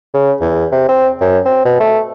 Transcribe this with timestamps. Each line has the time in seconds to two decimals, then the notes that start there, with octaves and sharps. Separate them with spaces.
0.14 C#3
0.41 E2
0.72 C3
0.88 C4
1.21 F#2
1.45 C4
1.65 B2
1.80 A3